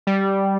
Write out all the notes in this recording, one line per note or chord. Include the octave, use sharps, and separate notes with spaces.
G3